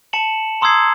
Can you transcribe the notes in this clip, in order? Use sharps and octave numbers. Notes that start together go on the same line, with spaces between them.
A5 C#7 E7 F#7
A#5 C6 D#6 E6 G#6 C7